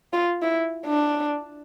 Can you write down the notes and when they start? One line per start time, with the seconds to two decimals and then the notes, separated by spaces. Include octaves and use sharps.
0.13 F4
0.42 E4
0.86 D4